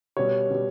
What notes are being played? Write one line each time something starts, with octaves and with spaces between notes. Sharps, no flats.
B2 G3 C#5
B2 G3